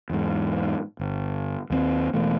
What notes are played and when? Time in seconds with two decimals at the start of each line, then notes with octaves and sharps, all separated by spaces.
0.10 E2 G#2
0.99 G1
1.70 D#2 G3 C4
2.14 E1 E2 A3